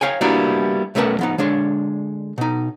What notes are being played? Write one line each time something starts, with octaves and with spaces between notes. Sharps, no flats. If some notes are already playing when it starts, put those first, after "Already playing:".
C#5 F5 G5 G#5
G3 A#3 B3 D4 E4 F#4
B1 A3 C#4 A#4 B4 A5
F3 B3 D#4
D3 G#3 D4 C#5
B2 D#4